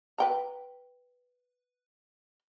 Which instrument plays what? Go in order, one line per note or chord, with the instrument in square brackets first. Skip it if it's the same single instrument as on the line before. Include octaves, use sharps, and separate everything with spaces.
[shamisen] B4 G5 A#5